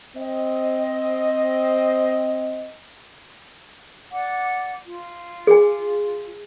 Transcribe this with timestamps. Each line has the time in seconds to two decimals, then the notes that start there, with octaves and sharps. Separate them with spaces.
0.16 C4 D#5
4.12 D5 F#5 D6
4.87 F4
5.47 G#4 G#5